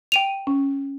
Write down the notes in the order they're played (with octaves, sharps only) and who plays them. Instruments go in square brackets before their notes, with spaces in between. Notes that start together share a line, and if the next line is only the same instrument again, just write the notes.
[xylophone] G5 D#7 F7
[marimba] C#4